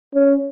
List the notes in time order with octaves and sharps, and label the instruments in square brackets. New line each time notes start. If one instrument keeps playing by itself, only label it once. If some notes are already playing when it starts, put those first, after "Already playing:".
[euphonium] C#4